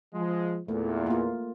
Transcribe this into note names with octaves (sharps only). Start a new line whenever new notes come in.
F3 G#3
E2 A#2 A3
A#3 F4